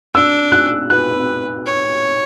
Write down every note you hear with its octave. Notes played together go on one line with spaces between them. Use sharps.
D4 E6
F#6
B4 F#6
C#5